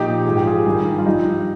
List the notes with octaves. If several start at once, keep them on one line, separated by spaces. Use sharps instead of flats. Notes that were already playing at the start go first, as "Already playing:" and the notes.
Already playing: A#2 F3 D#4 G4
G#2 F3 G#4
G4
F4 G#4
G2 D#3
F4
G2 F3 D#4 G4